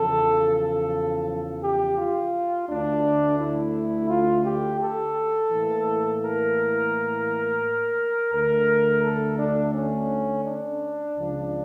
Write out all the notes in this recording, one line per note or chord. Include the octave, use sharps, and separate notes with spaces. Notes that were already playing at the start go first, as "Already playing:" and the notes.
Already playing: E2 C#3 F3 A4
A4
G4
F4
D2 D3 A3 D4
E4
F4
G4
A4
A2 E3 A#3
A#4
D2 D3 A3 A#4
A4
D4
C#4
D4
C#2 C#3 F3